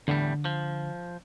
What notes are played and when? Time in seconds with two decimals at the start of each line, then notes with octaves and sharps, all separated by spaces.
0.08 E2 A2 D3 G3
0.45 F3